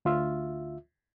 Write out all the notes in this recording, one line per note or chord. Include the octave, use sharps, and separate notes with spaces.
D2 F4 E5